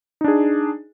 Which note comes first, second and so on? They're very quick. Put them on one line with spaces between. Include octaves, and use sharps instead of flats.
D#4 D4 G#4